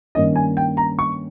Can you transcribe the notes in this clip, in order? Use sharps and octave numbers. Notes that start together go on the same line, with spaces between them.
G2 D#3 A#3 C#4 D#5
G#5
G5
A#5
C#6